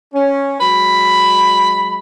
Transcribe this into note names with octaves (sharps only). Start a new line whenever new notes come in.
C#4
F#3 G#3 B5